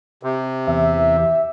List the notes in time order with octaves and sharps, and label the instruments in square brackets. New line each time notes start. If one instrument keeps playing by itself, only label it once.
[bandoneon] C3
[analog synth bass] E2 [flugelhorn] E5